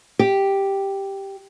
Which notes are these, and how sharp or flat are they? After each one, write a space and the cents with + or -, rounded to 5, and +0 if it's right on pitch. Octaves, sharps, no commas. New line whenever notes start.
G4 +0